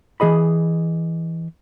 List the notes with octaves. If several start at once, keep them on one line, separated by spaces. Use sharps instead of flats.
E3 G#4 D#5 B5